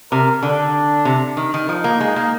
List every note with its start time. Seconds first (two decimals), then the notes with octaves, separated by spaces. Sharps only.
0.12 C3 A#4
0.43 D3 D4
1.05 C3
1.37 D#3
1.54 D#3
1.69 F3 D#4
1.84 A#3
2.00 G#3
2.16 A#3